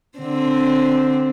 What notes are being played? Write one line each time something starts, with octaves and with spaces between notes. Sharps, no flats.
D3 C4